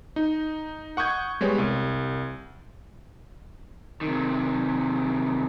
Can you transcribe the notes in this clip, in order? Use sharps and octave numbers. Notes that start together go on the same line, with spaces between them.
D#4
F#5 C#6 D#6 G6 G#6
G3 G#3 B3 C#5
C2
C3 D#3